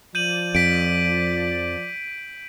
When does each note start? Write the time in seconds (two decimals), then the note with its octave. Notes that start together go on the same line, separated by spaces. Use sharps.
0.15 F3 D5 G6 D#7 F#7
0.55 F2 B6 D7